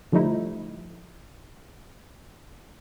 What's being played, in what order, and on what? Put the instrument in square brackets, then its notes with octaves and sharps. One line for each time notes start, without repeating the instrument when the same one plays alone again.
[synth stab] D3 F3 G3 A3 D#4 E4